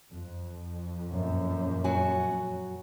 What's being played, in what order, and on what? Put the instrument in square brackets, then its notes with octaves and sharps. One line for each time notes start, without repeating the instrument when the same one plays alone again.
[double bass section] F2
[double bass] F#2 A#2
[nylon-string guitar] F#3 F#4 G#5